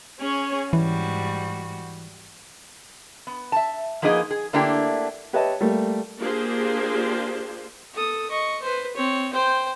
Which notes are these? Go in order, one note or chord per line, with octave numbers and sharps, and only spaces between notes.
C#4 G#4 C#5
G#2 E3 G3 F#4
B3
E5 A5
F3 A#3 B3 D#4 G#4 D#5
G#4
D3 A3 A#3 D4 E4 G4
G4 B4 C#5 D#5 E5 A5
G3 A3 A#3
A#3 D4 F4 G4 G#4 C5
A4 D#6
D#5 C#6
B4 C5
C4 C#5
C5 G5